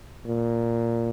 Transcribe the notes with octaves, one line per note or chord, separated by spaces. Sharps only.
A#2